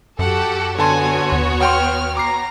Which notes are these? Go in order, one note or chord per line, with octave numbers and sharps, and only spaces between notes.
F#2 F#4 G4 A4 F#5
D3 B3 F#4 C#5 G#5 A5 C6
D#2
F#5 G5 C6 F6
A#5 D6 C7